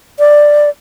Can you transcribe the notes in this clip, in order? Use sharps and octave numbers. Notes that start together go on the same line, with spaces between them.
D5